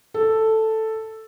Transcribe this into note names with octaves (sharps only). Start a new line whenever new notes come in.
A4